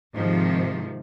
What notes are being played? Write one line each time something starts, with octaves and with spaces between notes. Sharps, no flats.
G#2 C3 D#3 F3